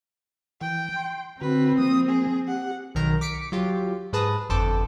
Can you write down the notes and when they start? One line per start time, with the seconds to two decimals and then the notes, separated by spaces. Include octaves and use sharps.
0.61 E3 G5
0.96 C6
1.41 D3 C4 F#4 B4
1.78 F3 A#3 D#6
2.09 G#4
2.48 G4 F#5
2.95 B1 D#3 A#4 A#5
3.21 D6 B6 C#7 D7
3.52 F#3 F4 G4
4.13 G#2 G#4 B4 A5 D#6 A#6
4.49 G1 F2 A4 C5 A5 D6